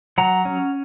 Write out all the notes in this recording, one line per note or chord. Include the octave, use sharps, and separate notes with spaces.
F#3 F#5 A#5
C#4